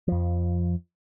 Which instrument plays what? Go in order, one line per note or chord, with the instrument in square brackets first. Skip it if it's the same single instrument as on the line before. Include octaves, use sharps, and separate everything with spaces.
[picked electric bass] F2 F3